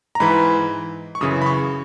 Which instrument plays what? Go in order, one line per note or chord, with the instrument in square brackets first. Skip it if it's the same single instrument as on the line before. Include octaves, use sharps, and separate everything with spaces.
[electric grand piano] A#5
G#2 E3 B5
C#6
F#2 C#3 E3 D#6
B5
C#6